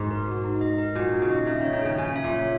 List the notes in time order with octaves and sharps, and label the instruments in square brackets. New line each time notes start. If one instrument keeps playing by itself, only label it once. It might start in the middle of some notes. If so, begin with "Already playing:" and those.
Already playing: [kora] G#2 B2
[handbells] A#4
F#4
D#4
D#5
A#4
[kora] A#2 [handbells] F#4
[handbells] D#4
[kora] C#3
[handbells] D#5
[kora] C#3 [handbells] E5
[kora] D#3 [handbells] C#5
[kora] D#3
[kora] C#3 [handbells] G#4
[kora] C#3 [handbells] G#5
[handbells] E5
[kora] A#2
[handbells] C#5